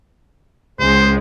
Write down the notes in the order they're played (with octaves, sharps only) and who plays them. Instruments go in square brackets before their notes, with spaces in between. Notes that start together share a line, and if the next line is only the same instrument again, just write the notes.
[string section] C#2 G#3 [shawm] C5